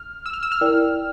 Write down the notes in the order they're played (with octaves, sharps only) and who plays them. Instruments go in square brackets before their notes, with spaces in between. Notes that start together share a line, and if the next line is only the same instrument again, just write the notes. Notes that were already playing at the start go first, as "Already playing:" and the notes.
Already playing: [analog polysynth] F6
E6
F6
E6
F6
[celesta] E4 A#4 D5 G5